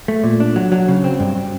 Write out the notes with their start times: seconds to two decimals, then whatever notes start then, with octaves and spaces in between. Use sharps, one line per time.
0.08 A3
0.24 A#2
0.40 D4
0.56 F#3
0.72 F#3
0.88 C#3
1.04 C4
1.20 G2